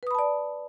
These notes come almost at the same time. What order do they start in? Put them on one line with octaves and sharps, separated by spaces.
B4 D#6 B5 A5 D5